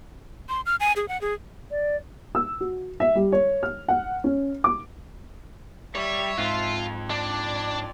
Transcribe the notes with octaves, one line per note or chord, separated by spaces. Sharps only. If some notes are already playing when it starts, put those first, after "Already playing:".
C6
F6
G#5
G#4
F#5
G#4
D5
E6
F#4
E5
G3
C#5
F6
F#5
C#4
D6
G3 C#5 E5
F2 G#2 F3 D#4 F4 F#6
D4 D5